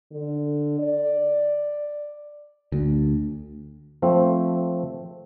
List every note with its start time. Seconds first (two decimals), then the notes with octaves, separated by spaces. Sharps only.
0.12 D3
0.79 D5
2.72 D2
4.02 F3 A3 C4